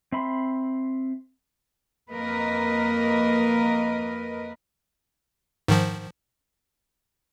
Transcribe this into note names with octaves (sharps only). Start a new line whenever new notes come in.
C4 E5 B5 C6
F2 A#3 A#4 B4 D#5
G#2 D#3 F3